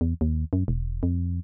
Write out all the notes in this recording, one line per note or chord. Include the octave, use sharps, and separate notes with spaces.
E2
D#2
F#2
E1
F2